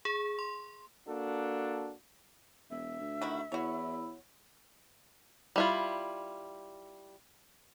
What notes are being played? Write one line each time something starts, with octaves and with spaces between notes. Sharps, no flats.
G#4
C6
A#3 D4 F#4 A4
E1 E5
D2
D#3 E4 F#4
E2 E4 F#4 C#5
G3 E4 F4